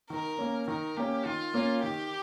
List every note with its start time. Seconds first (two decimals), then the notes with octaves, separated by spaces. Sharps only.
0.10 D#3 A#4
0.39 A#3 C#4
0.68 D#3 A#4
0.96 A#3 C#4 G4
1.25 D#3 F4
1.54 A#3 C#4
1.83 D#3 G4